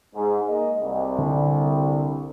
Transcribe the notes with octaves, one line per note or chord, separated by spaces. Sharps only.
G#2
A#3 D#5
C2
D3